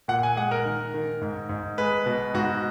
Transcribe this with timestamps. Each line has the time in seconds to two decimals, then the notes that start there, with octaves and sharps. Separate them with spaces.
0.08 A#2 F#5
0.23 G#5
0.36 G#3 F#5
0.51 A#4
0.65 D#3
0.94 D#3
1.21 G#2
1.49 G#2
1.78 G#3 B4
2.06 B2
2.34 G#2 F#4